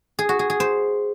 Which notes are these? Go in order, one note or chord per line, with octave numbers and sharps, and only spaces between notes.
G#4
F#4
G#4
G#4
C5